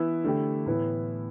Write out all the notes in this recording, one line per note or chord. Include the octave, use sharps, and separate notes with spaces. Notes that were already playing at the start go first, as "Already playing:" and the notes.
Already playing: E3 B3 E4
D3 A3 E4 G4
A2 E3 B3 E4